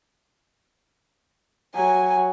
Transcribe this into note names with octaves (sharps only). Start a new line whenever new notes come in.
F#3 G#5